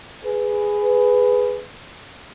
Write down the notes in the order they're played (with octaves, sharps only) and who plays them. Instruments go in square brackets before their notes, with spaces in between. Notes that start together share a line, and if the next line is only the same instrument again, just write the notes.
[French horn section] G#4 B4